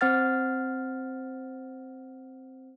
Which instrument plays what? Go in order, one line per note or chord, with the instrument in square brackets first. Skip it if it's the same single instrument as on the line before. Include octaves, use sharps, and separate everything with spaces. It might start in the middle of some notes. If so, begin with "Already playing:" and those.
[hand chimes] C4 C5 F#5 F6 A6